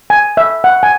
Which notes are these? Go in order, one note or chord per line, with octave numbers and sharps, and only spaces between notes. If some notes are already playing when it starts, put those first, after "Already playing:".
G#5
E5
F#5
G#5